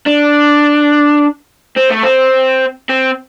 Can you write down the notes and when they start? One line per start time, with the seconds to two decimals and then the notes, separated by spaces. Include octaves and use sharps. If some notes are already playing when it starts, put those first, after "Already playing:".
0.06 D4
1.76 C4
1.90 A3
2.03 C4
2.89 C4